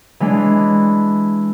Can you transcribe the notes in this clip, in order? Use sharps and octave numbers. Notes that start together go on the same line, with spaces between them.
E3 G#3 D4